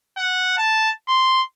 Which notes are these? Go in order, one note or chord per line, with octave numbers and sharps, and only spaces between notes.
F#5
A5
C6